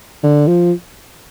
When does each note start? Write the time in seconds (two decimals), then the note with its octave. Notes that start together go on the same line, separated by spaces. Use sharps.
0.24 D3
0.47 F3